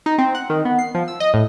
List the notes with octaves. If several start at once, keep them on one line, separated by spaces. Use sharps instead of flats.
D#4
C4
F#5
D#3
B3
C7
F3
E6
D#5
A2